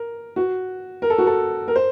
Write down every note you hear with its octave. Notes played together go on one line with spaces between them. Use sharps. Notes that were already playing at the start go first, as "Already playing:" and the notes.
Already playing: A#4
F#4
A#4
A4
F#4
A4
A#4
C5